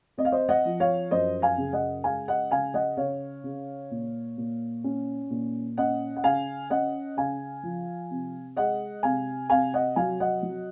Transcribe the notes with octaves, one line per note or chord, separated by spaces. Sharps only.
C4 D#5
F5
C5 D#5
D#5 F#5
F3
C#5 F5
F#2 C5 D#5
F5 G#5
C#3
D#5 F#5
G#3 F5 G#5
D#5 F#5
C#3 F5 G#5
D#5 F#5
C#3 C#5 F5
C#3
A#2
A#2
C#4
A#2
C#4 D#5 F#5
F#5
C#3 F5 G#5
C#4 D#5 F#5
C#3 F5 G#5
F3
C3
G#3 D#5 F#5
C3 F5 G#5
C3 F5 G#5
D#5 F#5
F#3 F5 G#5
D#5 F#5
F#3